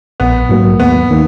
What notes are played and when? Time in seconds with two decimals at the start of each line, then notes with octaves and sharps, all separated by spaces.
0.20 A#1 B3
0.50 G#2 F#3 A#3
0.80 D#2 B3
1.10 D#3 A#3